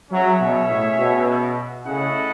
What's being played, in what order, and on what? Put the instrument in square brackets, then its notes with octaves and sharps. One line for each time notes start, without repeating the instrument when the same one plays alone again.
[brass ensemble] F#3 [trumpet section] C#4 G#4 C#5 E5
[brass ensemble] B2
A2
B2
[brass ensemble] C#3 [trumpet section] A3 E4 A4 D#5 F#5